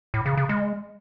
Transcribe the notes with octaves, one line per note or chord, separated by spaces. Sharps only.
A2
C#3
C#3
G#3